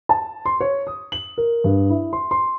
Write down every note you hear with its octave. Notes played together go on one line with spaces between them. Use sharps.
A5
C6
C#5
D#6
F#7
A#4
G2
E4
C6
C6